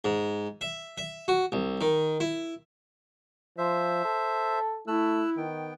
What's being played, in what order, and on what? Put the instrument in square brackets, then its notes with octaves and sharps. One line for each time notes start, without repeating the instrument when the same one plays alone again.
[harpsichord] G#2
E5
E5
F#4
C2
D#3
E4
[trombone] F3 [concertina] C5 E5
[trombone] A4
[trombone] A3 [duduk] E4 [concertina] E6 F#6
[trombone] D#3 [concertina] B3 G5